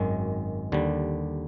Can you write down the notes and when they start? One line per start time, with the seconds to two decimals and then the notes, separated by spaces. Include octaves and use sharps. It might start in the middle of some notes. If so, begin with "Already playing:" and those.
Already playing: G#1 F#2 D#3 G#3
0.72 D#2 D3 G3